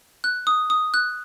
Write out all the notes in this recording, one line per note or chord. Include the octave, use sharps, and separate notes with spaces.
F#6
D#6
D#6
F#6